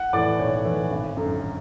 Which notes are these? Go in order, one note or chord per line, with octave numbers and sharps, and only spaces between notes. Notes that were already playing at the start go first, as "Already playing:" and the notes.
Already playing: F#5
A2 E3 D5
B1 C#5
A2 E3
G#1
F#2 D3